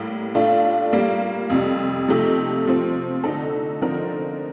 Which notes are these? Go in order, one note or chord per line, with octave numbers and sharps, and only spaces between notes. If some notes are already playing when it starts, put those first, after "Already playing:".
Already playing: A2 G3 A#3
A2 A3 D4 F4
G3 A#3 F4
F2 C3 G3
C3 F3 A3 D#4 G4
C3 F3 C4
D3 A3 D#4 A4
D3 F3 C4 D#4 A#4